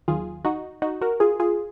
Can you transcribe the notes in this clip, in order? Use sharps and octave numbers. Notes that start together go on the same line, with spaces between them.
D#2 D#3 F#3 F4 G#4
D#4 F#4
D#4 F#4
F#4 A#4
F4 G#4
F4 G#4